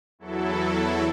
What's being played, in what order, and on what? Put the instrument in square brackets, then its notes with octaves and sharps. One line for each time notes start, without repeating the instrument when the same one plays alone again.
[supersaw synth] E2 F#3 E4 A4